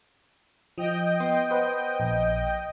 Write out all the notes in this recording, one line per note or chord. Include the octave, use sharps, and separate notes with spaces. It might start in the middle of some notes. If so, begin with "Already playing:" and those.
F3 D#5 G5
B3 C6 C7
B4 C5 F#5
A#1